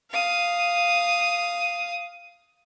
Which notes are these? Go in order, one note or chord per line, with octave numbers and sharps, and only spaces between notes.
F5 D#6